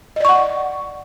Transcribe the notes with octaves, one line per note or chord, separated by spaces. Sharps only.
D5 D#5 F#5 C#6